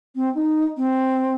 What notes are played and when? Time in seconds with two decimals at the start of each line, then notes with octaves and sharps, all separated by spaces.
0.15 C4
0.35 D#4
0.77 C4